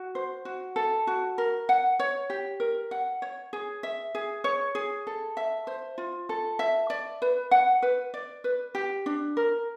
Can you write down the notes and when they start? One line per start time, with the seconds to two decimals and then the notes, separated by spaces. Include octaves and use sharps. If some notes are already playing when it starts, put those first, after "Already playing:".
Already playing: F#4
0.15 C5
0.45 F#4
0.76 A4
1.07 F#4
1.38 A#4
1.69 F#5
1.99 C#5
2.30 G4
2.60 A#4
2.91 F#5
3.22 C#5
3.53 G#4
3.83 E5
4.15 G#4
4.44 C#5
4.75 G#4
5.07 A4
5.37 E5
5.67 C5
5.98 F4
6.29 A4
6.59 E5
6.90 D5
7.22 B4
7.51 F#5
7.82 B4
8.14 D5
8.44 B4
8.75 G4
9.06 D4
9.37 A#4